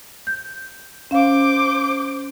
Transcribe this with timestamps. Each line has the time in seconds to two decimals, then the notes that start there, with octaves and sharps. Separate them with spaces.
0.27 G6
1.11 C#4 C5 F5 D6